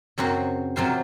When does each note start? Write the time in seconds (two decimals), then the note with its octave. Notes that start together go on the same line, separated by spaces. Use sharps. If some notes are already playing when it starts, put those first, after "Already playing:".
0.18 F#2 C#3 F#3 C4 F#4
0.76 C3 F#3 C4 F4 C5